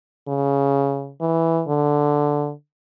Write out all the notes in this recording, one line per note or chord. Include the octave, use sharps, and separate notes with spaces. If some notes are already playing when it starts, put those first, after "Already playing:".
C#3
E3
D3